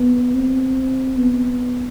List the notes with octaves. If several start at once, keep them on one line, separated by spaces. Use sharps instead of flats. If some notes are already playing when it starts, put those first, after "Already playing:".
Already playing: B3
C4
B3